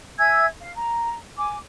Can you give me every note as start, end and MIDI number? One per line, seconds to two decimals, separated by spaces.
0.18 0.46 76
0.18 0.46 80
0.18 0.46 88
0.18 0.46 92
0.62 0.71 77
0.74 1.15 82
1.37 1.57 80
1.37 1.57 86